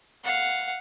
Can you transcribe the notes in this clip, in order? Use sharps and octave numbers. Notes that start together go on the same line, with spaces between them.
F5 F#5